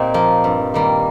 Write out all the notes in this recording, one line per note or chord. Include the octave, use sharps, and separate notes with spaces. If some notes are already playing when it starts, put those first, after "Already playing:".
Already playing: A#2 C4 D#4 F4 G4 A#4
F3 A#3
G2
D#3 G3 A#3